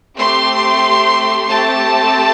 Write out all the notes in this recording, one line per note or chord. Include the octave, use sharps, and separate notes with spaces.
A3 C4 G4 C6
A3 C4 G4 A5